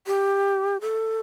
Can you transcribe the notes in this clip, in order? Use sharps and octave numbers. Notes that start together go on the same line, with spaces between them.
G4
A4